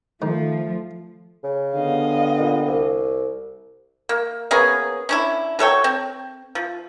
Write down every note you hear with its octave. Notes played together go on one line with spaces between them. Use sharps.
D#3 F3 A3
C#3
D3 B3 G4 D#5 F5
A#2
C2
A#3
A#3 B3 C#4 G#4
C#4 D4 E4
F#3 A4 C#5 G5
C4
F3